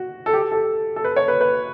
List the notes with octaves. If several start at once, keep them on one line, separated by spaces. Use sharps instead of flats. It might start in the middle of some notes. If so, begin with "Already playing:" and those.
Already playing: F#4
A4
G4
A4
A4
B4
C#5
B4
B4